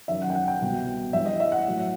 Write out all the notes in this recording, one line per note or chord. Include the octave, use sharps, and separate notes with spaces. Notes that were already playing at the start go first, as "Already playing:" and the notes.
F#2 D#3 F#3 E5
F#5
G5
F#5
G5
C2 B2 G3
G2 E3 G3 E5
D#5
E5
F#5
A2 F#3